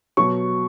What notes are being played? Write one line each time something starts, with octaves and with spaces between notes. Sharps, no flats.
B2 F#3 C#6